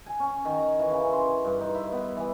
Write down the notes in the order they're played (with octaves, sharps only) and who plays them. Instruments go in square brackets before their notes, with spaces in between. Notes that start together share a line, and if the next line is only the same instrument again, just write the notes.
[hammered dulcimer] G#5
C#4
D#3
A#5
E3
C#3
C6
G2
D#4
E4
B3
E3